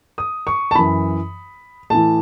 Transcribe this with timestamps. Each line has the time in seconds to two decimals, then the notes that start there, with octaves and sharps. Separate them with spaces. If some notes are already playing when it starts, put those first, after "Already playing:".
0.18 D#6
0.47 C#6
0.71 A5
0.75 F#2 E3 B5
1.90 A2 E3 A5